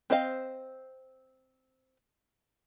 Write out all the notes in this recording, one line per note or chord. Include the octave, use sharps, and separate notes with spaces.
C4 C5 D#5 F5